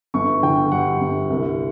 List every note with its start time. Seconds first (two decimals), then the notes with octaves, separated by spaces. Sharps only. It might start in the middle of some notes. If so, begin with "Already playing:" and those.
0.14 G1 C#6
0.43 D3 G5
0.72 G2 F#5
1.01 G1
1.30 C2